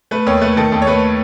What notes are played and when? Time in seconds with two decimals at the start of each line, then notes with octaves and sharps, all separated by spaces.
0.11 A3 B4
0.27 D#2 C#5
0.41 A3 B4
0.57 D#3 A4
0.72 D#2 A4
0.82 C#5
0.87 A3 B4